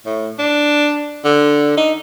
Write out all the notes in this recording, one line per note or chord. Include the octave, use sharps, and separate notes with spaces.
A2
D4
D3
D#4